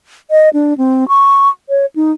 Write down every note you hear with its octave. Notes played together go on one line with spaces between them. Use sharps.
D#5
D4
C4
C#6
C#5
D#4